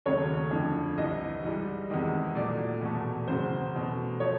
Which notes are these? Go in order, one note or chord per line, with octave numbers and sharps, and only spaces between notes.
D#2 C#3 F#3 A3 C#5
F2 D3 F3
C2 C3 E3 D#5
G#2 E3 G3
E2 C3 D#3 G#3
A#2 F#3 A3 D5
E2 B2 F#3 A3
E2 C#3 F#3 C5
E2 B2 F#3 A3
F3 A3 C#5